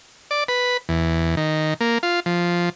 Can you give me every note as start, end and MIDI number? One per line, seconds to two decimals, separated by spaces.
0.31 0.44 74
0.48 0.77 71
0.89 1.35 40
1.37 1.74 51
1.81 1.98 58
2.03 2.20 65
2.26 2.69 53